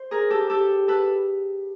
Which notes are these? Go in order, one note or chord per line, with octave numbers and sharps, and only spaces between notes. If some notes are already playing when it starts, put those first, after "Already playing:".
Already playing: C5
G#4 A#4
G4 A4
G4 A4
A4 B4